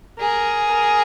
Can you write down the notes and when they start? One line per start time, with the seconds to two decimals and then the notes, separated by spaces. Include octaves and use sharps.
0.20 G#4 A#4
0.71 A#4